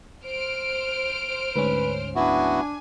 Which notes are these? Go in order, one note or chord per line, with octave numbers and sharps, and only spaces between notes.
C5 F6 D7
D2 G#2 C#4 B4
B3 D4 E4 F#4 G#5